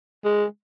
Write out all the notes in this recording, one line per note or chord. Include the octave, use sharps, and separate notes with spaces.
G#3